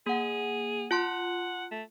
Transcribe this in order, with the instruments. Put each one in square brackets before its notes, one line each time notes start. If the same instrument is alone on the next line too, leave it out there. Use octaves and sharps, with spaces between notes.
[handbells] A#3 F#5 [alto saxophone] G#4
[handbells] F4 A5 C6 [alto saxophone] F#5
[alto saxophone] A3